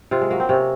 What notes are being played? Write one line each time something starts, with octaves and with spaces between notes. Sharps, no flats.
C3 F4
G#3
F#3 A#3
C4
C3 C#4